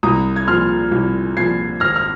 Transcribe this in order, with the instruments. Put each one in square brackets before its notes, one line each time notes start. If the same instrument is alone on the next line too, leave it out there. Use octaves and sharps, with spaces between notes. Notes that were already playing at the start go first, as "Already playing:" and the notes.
[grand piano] C2 A#5 D#6
G#6
A#2 F3 C6 F6
C2
A#2 F3 G#6 C7
G#1 F6 A#6
F6